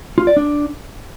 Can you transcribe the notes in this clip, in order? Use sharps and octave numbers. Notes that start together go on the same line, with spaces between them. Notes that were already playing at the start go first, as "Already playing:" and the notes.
F4
D5
D4